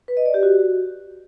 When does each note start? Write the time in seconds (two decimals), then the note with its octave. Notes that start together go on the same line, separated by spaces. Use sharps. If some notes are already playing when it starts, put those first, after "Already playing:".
0.08 B4
0.17 D#5
0.26 D5
0.34 G4
0.43 F#4